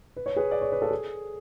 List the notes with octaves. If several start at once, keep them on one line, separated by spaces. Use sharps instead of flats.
B4
C#5
G#4 B4
D5
C#5
B4
A4
G#4